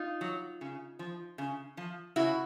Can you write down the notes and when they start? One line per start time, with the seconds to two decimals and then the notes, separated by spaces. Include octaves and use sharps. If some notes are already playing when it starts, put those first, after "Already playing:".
Already playing: D#4 F4
0.21 F#3
0.61 C#3
0.99 F3
1.38 C#3
1.77 F3
2.16 C#3 E4 F#4